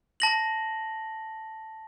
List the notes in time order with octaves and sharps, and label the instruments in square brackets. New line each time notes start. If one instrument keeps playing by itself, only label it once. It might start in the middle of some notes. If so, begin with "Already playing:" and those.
[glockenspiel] A5 A#6 F#7